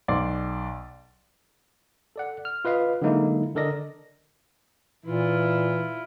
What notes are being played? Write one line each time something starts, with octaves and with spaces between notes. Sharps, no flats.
B1 D5 C6
A4 D5 F#5
F6
F4 B4 D#5 F5
D3 F#3 G#3 A#3 D#4 E4
D3 A4 A#4 D5 D#5 A#6
A#2 E3 E4 F4